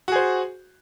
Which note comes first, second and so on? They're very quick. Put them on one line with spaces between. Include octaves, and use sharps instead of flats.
F#4 G#4 C5